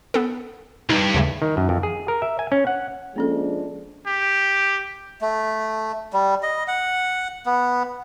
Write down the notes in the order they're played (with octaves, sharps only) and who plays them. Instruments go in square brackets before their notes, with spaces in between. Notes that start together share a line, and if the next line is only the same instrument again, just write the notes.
[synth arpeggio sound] B3 A4
[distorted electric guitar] C2 G2 [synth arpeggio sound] D#4
[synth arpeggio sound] D#2 C#3 A3
[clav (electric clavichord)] D#3
F#2
F2
G#4
A#4
E5
G#5
C#4
F#5
[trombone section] F3 G#3 D4 [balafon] A#3 C#4 A4
[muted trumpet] G4
[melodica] A3
G3
D#5
F#5
B3